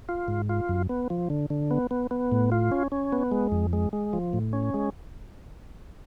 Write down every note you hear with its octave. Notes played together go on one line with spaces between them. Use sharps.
F4
G#2
F4
F#2
B3
F3
D3
D3
B3
B3
B3
A2
F4
C#4
C#4
B3
G#3
F2
G#3
G#3
F3
A2
C#4
G#3